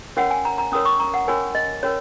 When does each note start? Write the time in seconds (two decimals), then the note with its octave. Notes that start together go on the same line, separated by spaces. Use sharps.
0.17 C#4 F#4 A#4 C#5 F#5
0.31 G#5
0.45 A#5
0.58 A#5
0.72 C#4 F#4 A#4 C#5 D#6
0.85 C#6
1.00 A#5
1.14 F#5
1.27 C#4 F#4 A#4 C#5 G#5
1.55 D#5
1.83 C#4 F#4 A#4 C#5